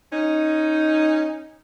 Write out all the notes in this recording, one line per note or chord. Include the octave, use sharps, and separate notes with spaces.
C#4 D#4